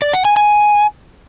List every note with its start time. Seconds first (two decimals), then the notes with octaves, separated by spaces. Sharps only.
0.02 D5
0.13 F#5
0.25 G#5
0.37 G#5